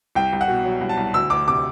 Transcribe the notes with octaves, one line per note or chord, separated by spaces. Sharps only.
C2 G5
C2
F#5
B2
F#3
C2
A5
C2
D2 E6
D2 D6
C3 D6